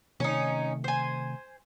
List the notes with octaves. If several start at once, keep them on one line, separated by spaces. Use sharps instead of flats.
C3 D#3 A3 C#4 D#4
C5 G#5